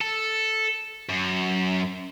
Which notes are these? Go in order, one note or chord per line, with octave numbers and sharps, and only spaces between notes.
A4
F#2